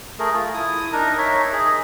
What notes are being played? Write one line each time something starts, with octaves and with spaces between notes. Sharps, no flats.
A3 G#4 A#4
F4
E4 D#6
D4 D#4 A#4 A#5
D#4 A#4 C#5 E5
G#4 D#5